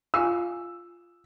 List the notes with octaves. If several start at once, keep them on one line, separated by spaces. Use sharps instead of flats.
F4 F5 G#5 E6